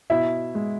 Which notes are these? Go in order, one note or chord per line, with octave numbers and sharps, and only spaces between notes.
B2 E4 E5
G#3